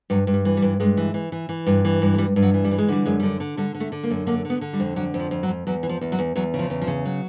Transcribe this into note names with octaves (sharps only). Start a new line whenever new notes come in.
G2 F#3
G2
G3
E3
G3
G2
G2 G#3
E3
E3
E3
E3
G2
E3
G2
G#3
G2 G3
G2
F#3
E3
G3
E3
G#3
D3 G3
F#2 G#3
D3 G3
D3
D3 G3
D3
A3
D3
A#3
F#2
D3 A#3
D3 B3
D3
G3
F2
D3 F#3
F2
F3
F2
F#3
F2
E2 F#3
E3
F3
E2
F#3
E2
E2 F#3
C#3
F3
E2
F3
C#3
F#3